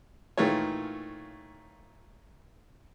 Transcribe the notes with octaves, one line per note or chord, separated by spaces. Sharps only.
A#2 D#3 E3 A3 F4 C#5